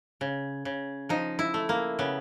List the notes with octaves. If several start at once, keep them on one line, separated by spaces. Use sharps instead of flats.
C#3
C#3
F3 D#4
E4
A3
A#3
C#3 B3